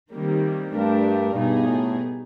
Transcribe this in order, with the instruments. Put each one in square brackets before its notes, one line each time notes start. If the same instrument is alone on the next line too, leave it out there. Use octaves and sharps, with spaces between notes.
[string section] C3 D#3 G3 A#3
[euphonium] G2 [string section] A3 D4 G4 A#4
[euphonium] G2 [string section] B2 G3 B3 D#4 G#4
[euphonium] A2